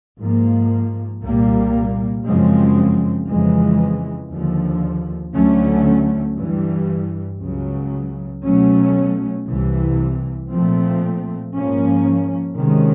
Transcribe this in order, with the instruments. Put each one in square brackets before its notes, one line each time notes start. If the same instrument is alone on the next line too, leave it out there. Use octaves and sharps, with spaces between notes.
[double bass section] G#2 F3 A#3
C2 A#2 G3 A#3
F#2 C#3 F3 G#3 C4
F2 C#3 E3 G#3
D#2 D3 F3
D2 D3 F#3 A3 C#4
G2 E3 G3
C#2 C#3 F#3
B2 F#3 A3 C#4
C2 C3 E3
A#2 F3 A3 C4
G#2 F3 A#3 C#4
C3 D#3 G#3 C#4